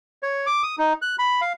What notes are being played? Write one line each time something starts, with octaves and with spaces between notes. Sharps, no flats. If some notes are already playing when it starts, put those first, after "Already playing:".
C#5
D6
D#6
D#4
F#6
B5
F5